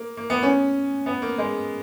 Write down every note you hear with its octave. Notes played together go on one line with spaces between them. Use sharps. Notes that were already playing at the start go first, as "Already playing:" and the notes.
Already playing: A#3
A#3
B3
C#4
B3
A#3
G#3